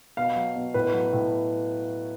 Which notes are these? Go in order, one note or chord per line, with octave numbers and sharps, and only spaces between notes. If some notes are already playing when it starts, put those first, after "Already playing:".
B2 F5
F#3
B2
A2 B4
F#3
A2